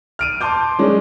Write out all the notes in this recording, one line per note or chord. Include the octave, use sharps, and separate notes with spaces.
F6 D7 D#7
A5 C6 D6 G6
G#3 C#4 D4